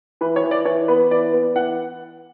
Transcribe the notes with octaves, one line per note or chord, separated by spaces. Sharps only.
E3 B4
C#5
E3
D5
E3 C#5
B3 B4
E3 D5
B3
E3 F#5